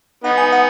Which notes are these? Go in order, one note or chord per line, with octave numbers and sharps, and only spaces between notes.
B3 D#4 F#5
G#5
F#5